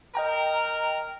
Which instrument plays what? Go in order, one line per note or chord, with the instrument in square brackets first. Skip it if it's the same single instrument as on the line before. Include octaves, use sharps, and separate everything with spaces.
[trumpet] A#4 [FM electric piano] D#5 G5 A#5